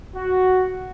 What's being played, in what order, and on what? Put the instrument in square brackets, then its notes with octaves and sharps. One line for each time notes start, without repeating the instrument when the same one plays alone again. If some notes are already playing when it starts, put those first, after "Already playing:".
[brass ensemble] F#4